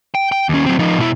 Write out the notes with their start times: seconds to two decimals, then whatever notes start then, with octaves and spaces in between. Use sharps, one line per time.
0.15 G5
0.32 G5
0.49 D#2 C#4
0.66 F#3 C4
0.79 F3 D#4
0.98 B2 E4